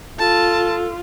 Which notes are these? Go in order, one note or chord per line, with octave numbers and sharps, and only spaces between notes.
F4 A4 A5